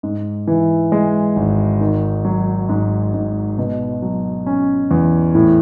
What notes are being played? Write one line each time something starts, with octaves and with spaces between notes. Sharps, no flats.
G#2
E3
G#3
G#1
D#3
F#3
G#2
G#2
B2
F#3
C#4
E2
A2